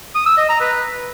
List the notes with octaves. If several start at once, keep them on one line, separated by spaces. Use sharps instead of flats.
D#6
E6
D#5
A#5
B4